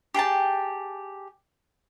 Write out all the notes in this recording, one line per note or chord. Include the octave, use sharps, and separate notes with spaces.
G4 G#4 G5 A5